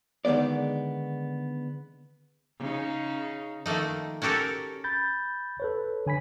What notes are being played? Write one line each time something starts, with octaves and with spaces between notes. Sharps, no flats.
D3 D#3 G#3 B3 D5
C#3 D#4
D#3 F3 A3 A#3 D#4
C#4 F#4 G4 A4 A#4 C#5
B5 G6 A6
A4 B4 C#5
D3 G#5 B5 B6